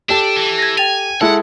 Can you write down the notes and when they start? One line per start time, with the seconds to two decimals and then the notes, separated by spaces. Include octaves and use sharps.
0.09 D4 G4 A4
0.36 E3
0.58 G#6 A#6
0.78 G5 G#5 A6 F7
1.21 G#3 E4 A4 F#5